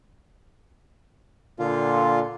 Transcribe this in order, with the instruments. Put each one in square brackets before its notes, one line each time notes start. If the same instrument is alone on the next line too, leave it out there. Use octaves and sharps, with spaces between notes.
[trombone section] A#2 D3 [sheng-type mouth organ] F4